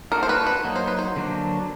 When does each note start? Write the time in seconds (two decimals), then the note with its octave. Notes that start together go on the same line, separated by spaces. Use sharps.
0.12 A#3 D4 F#4 A4 A#4
0.23 C5
0.29 B4
0.47 B4
0.64 F#3 A#3 D#4
0.76 C5
0.87 B4
0.99 C5
1.16 D3 F#3 A#3 D4